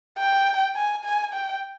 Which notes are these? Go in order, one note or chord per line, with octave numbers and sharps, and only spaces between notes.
G5
G#5
G#5
G5